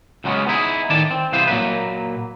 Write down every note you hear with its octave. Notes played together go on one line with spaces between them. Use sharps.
C#2 F#3 G#3 A3 B3 C#4
B3 D#4 E4 G#4
A2 D#3 D5 A5
C4
C2 E3 B3 F4 C5
A#2 F#3 A#3 B4